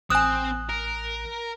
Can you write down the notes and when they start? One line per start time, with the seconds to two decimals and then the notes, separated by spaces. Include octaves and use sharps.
0.10 A1 C4 G#5 D#6 F#6
0.69 A#4